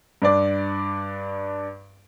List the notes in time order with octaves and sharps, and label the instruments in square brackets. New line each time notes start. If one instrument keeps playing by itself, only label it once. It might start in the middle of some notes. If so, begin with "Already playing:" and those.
[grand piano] G2 D4 D5